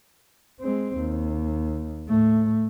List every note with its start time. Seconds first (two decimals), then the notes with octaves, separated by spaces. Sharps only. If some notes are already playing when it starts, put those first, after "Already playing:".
0.61 G#3 C4
0.98 D#2
2.09 A2 A3